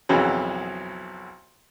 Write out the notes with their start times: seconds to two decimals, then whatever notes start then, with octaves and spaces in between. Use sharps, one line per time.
0.09 B1 F2 C#3 E3 F#3